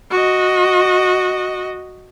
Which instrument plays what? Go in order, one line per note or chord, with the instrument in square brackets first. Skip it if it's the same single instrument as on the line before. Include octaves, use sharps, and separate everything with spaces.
[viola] F#4 D#5